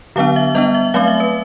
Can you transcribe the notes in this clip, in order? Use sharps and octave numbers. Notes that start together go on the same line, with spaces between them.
D3 F#3 B3 D4 F5
E5
G3 B3 D4 D#5
E5
F#3 A3 C4 F5
E5
B4